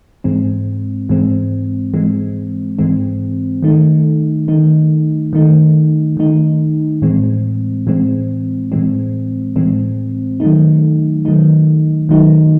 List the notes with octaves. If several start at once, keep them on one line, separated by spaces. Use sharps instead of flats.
G#2 E3 G#3 C4
G#2 E3 G#3 C4
G#2 E3 G#3 C4
G#2 E3 G#3 C4
D#3 A3 D#4
D#3 A3 D#4
D#3 A3 D#4
D#3 A3 D#4
A2 E3 G#3 C4
A2 E3 G#3 C4
A2 E3 G#3 C4
A2 E3 G#3 C4
D#3 F#3 A3 D#4
D#3 F#3 A3 D#4
D#3 F#3 A3 D#4